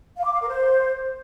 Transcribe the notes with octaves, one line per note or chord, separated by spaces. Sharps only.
F5
D6
F5
A#4
C5